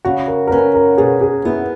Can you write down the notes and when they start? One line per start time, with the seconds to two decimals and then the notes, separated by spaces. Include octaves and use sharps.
0.05 C#3 F#4
0.28 A#4
0.47 A#4
0.51 C#4 B4
0.74 A#4
0.98 B2 G#4
1.21 G#4
1.45 B3 E4